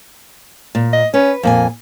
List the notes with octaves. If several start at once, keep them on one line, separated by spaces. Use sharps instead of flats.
A#2
D#5
C#4 B4
F2 A#2 A#3 G#5